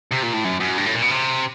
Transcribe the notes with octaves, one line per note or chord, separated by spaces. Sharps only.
C3
A#2
A2
F#2
F#2
G2
A2
A#2
B2
C3